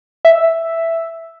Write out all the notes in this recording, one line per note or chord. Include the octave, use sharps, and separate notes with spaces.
E5